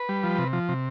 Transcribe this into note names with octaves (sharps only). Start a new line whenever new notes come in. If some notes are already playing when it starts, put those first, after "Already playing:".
Already playing: B4
G3
F3
C3
F3
C3